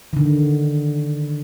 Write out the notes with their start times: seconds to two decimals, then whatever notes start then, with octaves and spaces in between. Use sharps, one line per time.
0.13 D3 D#3